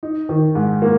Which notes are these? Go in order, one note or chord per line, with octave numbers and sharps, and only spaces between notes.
D#4
D#3
G#2
A#3